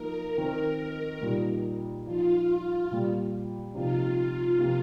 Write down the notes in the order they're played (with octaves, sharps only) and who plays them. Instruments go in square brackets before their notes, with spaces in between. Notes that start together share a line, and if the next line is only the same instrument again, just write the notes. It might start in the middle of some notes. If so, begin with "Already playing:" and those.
Already playing: [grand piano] F3 A#3 D#4 [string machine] A#4
[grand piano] D#3 C4 D#4 [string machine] A#4
[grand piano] A#2 G3 D#4
[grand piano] F3 D#4 [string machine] F4
[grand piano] A#2 G3 A#3
[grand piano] C3 F3 A#3 D#4 [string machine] F4
[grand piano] C3 F3 A#3